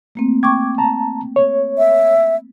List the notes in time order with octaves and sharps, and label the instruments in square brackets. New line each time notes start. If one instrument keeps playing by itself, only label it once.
[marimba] A3 A#3 C4
[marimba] G5 C#6 [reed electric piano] D6 G#6
[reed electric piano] A5 A#5
C#5
[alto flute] E5